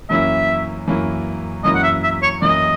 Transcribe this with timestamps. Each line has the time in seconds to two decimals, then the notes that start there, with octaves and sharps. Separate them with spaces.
0.09 F#2 E3 A#3 C#4 E4 E5
0.88 F#2 E3 A#3 C#4 E4
1.64 F#2 E3 A#3 C#4 E4 D#5
1.75 F#5
1.83 E5
2.03 E5
2.22 C#5
2.41 F#2 E3 A#3 C#4 E4 D#5